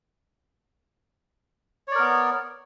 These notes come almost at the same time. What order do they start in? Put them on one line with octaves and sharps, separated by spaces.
C#5 D5 A#4 B3